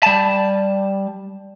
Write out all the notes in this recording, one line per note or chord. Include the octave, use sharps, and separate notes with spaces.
G3 A5